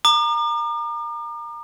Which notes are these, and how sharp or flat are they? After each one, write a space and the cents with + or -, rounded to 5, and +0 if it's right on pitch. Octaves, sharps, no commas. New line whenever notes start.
A#5 +0 D6 +45